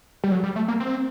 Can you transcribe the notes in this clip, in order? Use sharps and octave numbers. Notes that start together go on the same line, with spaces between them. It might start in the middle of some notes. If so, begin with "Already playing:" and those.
G3
F#3
G3
A3
A#3
C4